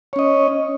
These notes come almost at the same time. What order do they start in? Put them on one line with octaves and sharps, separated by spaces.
C#5 C#4 D#5